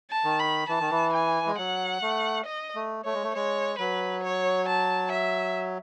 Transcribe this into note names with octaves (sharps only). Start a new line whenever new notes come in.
A5
D#3
B5
E3 A5
D#3
E3
G#5
G#3
F#3 F#5
A3
D#5
A3
A3 C#5
G#3
A3
G#3 C#5
F#3 B4
C#5
A5
E5